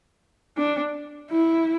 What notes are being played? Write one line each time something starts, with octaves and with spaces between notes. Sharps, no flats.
D4
E4